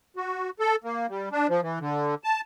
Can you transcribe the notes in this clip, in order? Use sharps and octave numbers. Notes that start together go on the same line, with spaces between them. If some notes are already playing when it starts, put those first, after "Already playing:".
F#4
A4
A#3
G3
D4
F3
E3
D3
A5